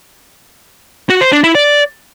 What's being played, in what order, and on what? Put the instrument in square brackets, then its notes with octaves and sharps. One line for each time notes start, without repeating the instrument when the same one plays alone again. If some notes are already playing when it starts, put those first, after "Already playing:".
[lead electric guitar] F#4
C5
D4
E4
D5